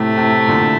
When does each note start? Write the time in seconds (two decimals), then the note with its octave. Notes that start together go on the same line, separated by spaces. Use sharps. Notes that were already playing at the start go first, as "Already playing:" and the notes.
Already playing: A2 C3 A3
0.17 A2 C3
0.48 A#2 D3